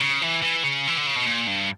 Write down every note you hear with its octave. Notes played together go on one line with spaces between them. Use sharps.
C#3
E3
E3
C#3
E3
D3
C#3
B2
A#2
G2